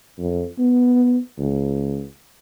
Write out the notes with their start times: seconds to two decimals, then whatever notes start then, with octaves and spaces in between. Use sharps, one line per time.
0.19 F2
0.58 B3
1.39 C#2